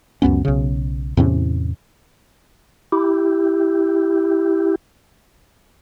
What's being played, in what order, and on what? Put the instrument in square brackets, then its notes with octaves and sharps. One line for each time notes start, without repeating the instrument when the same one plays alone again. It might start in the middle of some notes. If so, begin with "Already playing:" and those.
[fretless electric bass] C#2 F#2 B3 C#4
B1 C#3
E2 A2 C3 C#4
[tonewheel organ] E4 G4